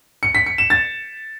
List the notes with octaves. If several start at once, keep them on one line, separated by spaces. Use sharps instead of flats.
C#7
B6
C#7
E7
A6